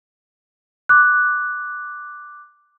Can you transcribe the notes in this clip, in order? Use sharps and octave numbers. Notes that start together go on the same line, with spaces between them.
D6 F#6